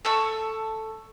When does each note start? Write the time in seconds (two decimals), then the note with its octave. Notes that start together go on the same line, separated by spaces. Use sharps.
0.05 A4 A5 C#6 E6